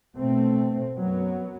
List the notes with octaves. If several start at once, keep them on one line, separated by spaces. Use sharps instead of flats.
B2 A3 C4
F#2 F#3 B3